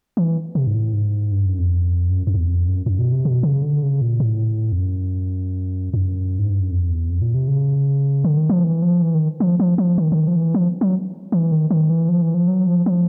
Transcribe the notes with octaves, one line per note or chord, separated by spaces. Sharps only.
E3
C3
G#2
A2
G#2
G2
F#2
F2
F#2
F2
E2
F2
F#2
F#2
B2
C3
B2
C#3
D3
C#3
A#2
A2
F2
F#2
F#2
G#2
G2
F#2
F2
E2
F2
A#2
C3
C#3
D3
D#3
F3
E3
F3
E3
D#3
F3
F3
F3
D#3
D3
D#3
F3
E3
F3
F#3
E3
D#3
D#3
E3
F3
E3
F3
F#3
F3
F3